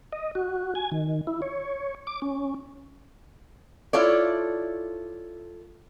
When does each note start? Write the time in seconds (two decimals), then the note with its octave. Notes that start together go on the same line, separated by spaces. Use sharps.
0.13 D#5
0.35 F#4
0.75 G#5
0.92 D#3
1.27 E4
1.42 C#5
2.07 D6
2.22 C#4
3.93 E4 F4 A4 C#5 D5